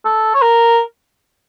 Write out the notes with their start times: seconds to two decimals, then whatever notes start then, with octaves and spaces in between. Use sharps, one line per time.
0.05 A4
0.34 C#5
0.42 A#4